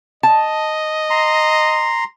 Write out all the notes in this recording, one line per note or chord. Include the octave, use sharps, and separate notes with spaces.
D#5 A5
A#5 C6